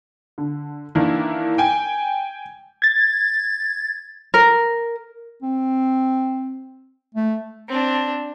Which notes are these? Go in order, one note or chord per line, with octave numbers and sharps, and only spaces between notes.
D3
D#3 E3 A#3 D4 E4
G5 G#5
G#6 A6
A#4
C4
A3
C4 D4